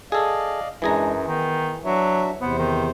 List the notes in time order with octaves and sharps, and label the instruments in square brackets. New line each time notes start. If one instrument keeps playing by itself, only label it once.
[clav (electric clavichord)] G#4 A4 [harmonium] D5 D#5 F5
[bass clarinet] F#2 [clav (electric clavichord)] E3 G#4 A#5 [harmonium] G#3 D4
[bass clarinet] D#3 [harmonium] B3
[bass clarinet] F#3 [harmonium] D4 F#4 E5
[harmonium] E2 C3 C5 [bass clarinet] B3
[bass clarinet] D#3